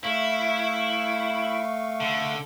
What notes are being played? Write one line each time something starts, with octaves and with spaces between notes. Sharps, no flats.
A3 E4 F5 C#6
D3